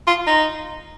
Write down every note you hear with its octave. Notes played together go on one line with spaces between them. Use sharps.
F4
D#4